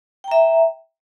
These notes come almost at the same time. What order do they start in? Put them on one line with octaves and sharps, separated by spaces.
G5 A#5 E5